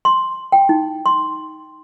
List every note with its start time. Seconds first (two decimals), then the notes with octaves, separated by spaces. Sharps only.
0.05 C6
0.52 G5
0.69 D#4
1.06 C6